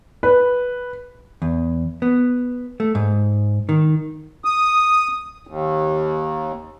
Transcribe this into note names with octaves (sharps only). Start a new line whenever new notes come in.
B4
E2
B3
A3
G#2
D#3
D#6
D#2